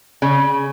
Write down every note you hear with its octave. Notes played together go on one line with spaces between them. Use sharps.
C#3